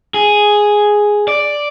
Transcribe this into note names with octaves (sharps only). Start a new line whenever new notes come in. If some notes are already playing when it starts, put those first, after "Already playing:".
G#4
D5